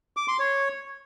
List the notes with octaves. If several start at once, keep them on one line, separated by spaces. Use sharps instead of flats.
D6
C6
C#5